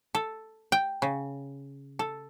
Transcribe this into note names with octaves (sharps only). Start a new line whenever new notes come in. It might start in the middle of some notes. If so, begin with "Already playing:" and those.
A4
G5
C#3
A4